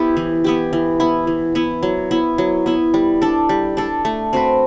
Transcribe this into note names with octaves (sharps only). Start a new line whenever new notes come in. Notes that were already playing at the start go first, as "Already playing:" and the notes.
Already playing: B3 E4 G4
E3
B3 E4 G4
E3
B3 E4
E3
B3 E4
F#3
B3 E4
F#3
B3 E4
G3
D4 A4
G3
D4 A4
A3
C4 F#4 B4